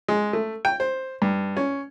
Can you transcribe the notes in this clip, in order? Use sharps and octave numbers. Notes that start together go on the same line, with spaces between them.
G#3
A3
G5
C5
G2
C#4